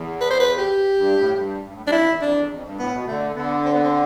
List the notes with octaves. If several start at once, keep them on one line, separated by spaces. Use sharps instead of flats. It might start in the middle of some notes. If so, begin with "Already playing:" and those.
Already playing: E2
B4
C5
B4
G4
G2
A2
F2
G2
G2
A2
G2
D4
F2 E4
E2
F2 D4
E2
F2
G2
A2 B3
B2
D3 A3
D3 B3
C4
B3
C4